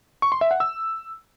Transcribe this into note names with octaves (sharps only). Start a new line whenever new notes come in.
C#6
C6
E5
F#5
E6